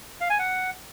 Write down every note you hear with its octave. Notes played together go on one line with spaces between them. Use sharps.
F5
G#5
F#5